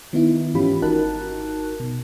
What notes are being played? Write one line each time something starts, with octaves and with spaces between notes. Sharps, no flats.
D#3 B3 D#4 E4
G#2 E3 C#4 F4 G4 B5
G#1 D#4 F#4 A#4 A5 F#6
B2